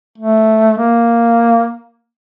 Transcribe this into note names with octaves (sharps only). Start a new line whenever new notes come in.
A3
A#3